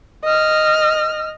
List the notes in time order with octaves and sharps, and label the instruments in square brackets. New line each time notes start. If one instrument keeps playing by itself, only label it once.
[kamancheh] D#5 F6